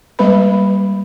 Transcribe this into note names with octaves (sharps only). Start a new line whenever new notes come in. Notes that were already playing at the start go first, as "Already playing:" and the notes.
G3 G#3 A#3 B4 B5